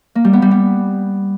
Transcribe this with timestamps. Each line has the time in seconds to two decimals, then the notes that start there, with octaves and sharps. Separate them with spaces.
0.15 A#3
0.24 G3
0.33 B3
0.42 G3
0.51 B3